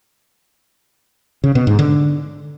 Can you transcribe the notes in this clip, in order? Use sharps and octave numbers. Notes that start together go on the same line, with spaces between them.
C#3
B2
G#2
D3